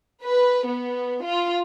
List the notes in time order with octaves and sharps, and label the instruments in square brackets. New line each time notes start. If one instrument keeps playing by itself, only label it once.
[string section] B4
B3
F4